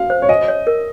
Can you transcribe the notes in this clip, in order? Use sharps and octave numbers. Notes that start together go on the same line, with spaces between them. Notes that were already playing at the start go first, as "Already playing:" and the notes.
Already playing: F#4 F5
C5
C#5
D#5 G#5
C#5
A#4